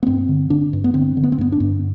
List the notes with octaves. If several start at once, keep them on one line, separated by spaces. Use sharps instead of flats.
B3
G2 C4
D3
D3 D4
G2
B3
D3 C4
D3
B3
C4
G2 B3
D4
G2